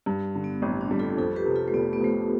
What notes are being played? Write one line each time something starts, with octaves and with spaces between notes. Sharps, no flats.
G2
D3
B3
A1 C4
D4
G3
F4 A4
F2 F4 A4
G4 B4
C3
F4 A4
A3
F1 B3
B3
F3 A3
B3